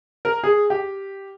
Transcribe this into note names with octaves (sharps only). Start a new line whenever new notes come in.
A#4
G#4
G4